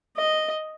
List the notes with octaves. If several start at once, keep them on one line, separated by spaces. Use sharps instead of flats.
D#5